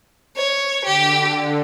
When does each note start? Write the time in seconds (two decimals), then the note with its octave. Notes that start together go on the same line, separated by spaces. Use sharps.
0.37 C#5
0.85 D3 G4